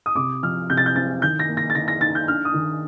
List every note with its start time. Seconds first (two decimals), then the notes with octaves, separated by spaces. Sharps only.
0.06 D#6
0.16 C3 D6
0.43 F3 F6
0.70 C3 G6
0.77 A6
0.86 G6
0.96 C4 A6
1.22 D#3 G6
1.39 A#6
1.49 A#3
1.57 A#6
1.70 A6
1.75 D#3 A#6
1.88 A#6
2.01 D#4 A6
2.15 G6
2.28 D4 F6
2.45 D#6
2.54 D#3